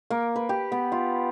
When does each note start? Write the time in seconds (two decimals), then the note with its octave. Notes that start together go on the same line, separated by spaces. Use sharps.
0.10 A#3
0.36 B4
0.49 G4
0.72 B3
0.92 F4